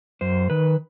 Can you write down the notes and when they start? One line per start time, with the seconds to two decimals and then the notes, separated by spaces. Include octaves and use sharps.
0.21 F#2 C5
0.50 D#3 B4